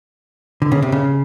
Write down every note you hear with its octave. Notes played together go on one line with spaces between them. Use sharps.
D3
C#3
C3
C#3